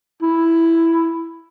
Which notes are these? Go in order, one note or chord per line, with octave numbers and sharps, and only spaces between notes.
E4